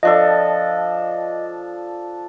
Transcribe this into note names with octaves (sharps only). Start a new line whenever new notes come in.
F3 D4 A4 D#5